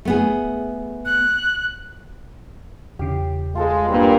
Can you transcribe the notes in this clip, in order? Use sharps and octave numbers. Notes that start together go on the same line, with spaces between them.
A3 B3 G#4
F#6
E2 C#3 G4
G#3 F4 A4 C5
G2 A#2 G3 A#3 C4 B4